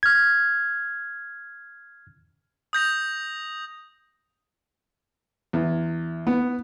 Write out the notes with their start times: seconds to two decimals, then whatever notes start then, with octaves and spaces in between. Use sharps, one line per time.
0.03 F6 G#6
2.73 D#6 G6 A#6 F7
5.53 E2
6.27 B3